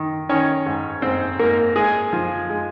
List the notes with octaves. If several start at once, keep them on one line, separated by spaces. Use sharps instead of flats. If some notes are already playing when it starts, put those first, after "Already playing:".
Already playing: D#3
D#3 C#4 C#5
G#2
G#2 C4 C5
G#2 A#3 A#4
G#3 G#4
F3
G#3